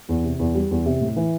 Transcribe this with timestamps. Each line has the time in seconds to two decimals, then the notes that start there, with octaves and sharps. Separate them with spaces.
0.09 E2
0.24 C3
0.39 E2
0.55 G3
0.71 E2
0.86 C3
1.01 A2
1.16 E3